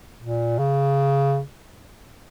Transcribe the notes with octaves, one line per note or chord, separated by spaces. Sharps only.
A#2
C#3